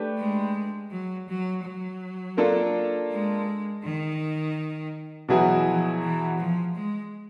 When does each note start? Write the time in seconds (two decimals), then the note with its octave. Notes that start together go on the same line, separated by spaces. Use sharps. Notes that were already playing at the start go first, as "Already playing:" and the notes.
Already playing: A3 D4 G4 B4
0.18 G#3
0.91 F#3
1.28 F#3
1.64 F#3
2.37 A#3 D4 F4 A4
3.10 G#3
3.83 D#3
5.29 B2 E3 F#3 B3 E4 G#4
5.65 F3
6.02 E3
6.39 F3
6.75 G#3